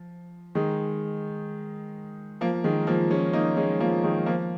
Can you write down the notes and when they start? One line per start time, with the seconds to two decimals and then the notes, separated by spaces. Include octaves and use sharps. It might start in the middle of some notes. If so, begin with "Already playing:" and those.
Already playing: F3
0.55 D#3 G#3
2.41 F3 A#3
2.64 D#3 G#3
2.87 F3 A#3
3.10 G#3 C#4
3.33 A#3 D#4
3.57 G#3 C#4
3.80 F3 A#3
4.04 D#3 G#3
4.26 F3 A#3